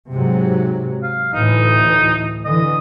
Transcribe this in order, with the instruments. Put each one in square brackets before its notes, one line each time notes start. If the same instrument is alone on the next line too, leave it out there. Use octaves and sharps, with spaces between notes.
[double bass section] G#2 C3 F#3
[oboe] F5
[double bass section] D2 A2 E3 [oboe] D#4
[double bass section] D3 E3 [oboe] D#5